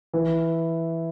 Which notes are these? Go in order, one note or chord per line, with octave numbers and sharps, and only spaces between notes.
E3